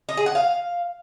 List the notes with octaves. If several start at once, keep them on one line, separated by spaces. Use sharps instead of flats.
D#5
G#4
F#5
F5